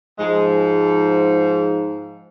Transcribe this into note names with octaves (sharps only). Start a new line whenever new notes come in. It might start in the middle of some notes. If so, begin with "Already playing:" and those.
G#2 F3 G#3